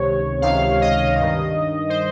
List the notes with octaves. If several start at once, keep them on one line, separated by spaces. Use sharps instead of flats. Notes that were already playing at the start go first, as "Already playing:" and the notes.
Already playing: C#2 C3 D#3 C#5
C#2 C3 D#3 F5
D#5
G2 D#3
C5